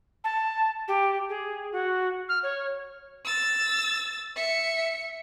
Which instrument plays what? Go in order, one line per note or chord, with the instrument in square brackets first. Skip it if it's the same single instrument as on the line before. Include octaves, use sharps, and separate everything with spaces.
[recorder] A5
G4
G#4
F#4
F6
C#5
[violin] E6 A6
E5 C#7